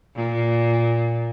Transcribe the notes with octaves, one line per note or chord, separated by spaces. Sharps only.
A#2